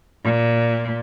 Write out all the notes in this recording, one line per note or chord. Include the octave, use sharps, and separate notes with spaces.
A#2